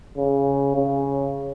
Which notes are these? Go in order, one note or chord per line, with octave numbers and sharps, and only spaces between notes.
C#3
C#3